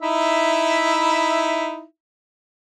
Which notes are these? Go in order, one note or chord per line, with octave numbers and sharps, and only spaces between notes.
D#4 E4 E5